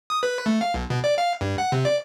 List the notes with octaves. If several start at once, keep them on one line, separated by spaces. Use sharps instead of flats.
D#6
B4
A3
F5
B1
B2
D5
F5
G2
F#5
C3
D5